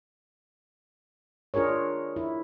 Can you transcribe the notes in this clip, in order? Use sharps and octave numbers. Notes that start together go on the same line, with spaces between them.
D4 F4 G#4 A#4 C#5
E4